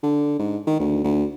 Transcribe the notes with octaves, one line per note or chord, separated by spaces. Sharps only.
D3
G#2
D#3
D2
D2